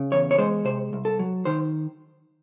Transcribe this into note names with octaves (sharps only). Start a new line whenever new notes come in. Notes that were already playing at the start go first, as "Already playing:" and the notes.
Already playing: C#3
E2 C#5
C#5
G#3 C5
C3 C5
C2
A4
F#3
D#3 C5